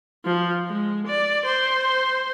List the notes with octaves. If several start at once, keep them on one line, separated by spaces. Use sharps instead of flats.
F3
G#3
D5
C5